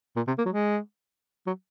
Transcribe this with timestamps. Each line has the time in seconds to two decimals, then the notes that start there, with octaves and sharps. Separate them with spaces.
0.16 A#2
0.27 C3
0.38 A#3
0.46 F#3
0.49 G#3
1.47 F#3